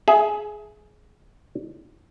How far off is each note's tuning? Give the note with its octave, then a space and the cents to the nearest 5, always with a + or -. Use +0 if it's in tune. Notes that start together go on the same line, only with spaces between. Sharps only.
G#4 +15 E5 +5